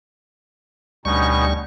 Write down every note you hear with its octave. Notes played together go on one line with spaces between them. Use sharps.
D2 B2 G3 C#4 D#4 C#6